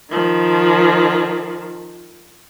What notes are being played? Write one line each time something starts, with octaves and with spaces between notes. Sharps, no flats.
D#3 F3